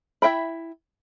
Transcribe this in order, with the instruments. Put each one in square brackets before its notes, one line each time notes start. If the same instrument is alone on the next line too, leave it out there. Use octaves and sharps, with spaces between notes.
[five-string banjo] E4 E5 G5 B5